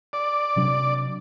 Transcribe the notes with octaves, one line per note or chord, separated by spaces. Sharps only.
D5
C3 F#3 D4